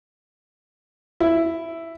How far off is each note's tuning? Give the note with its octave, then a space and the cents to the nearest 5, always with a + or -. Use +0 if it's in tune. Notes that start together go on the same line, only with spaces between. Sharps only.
E4 +5